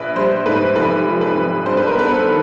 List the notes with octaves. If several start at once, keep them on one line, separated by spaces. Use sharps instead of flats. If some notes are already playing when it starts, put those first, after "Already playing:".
Already playing: A#1 B4
G3 C5
G#2 B4
F1 B4
F3
B4
F2
G2 C5
B4
A#4
B3 B4
A4
D#3